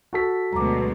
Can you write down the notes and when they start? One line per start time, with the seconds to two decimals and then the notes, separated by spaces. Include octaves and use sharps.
0.13 F#4 A4 B6
0.53 D2 B2 F#3 G#3 A#5 D6